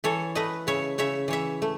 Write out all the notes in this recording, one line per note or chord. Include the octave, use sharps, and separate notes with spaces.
E3 A4 C#5
A3 B4 D#5
C#3 C#5 E5
C#3 C#5 E5
E3 C#5 E5
A3